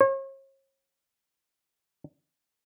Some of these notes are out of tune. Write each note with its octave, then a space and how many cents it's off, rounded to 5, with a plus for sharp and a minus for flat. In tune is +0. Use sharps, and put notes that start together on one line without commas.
C#5 -40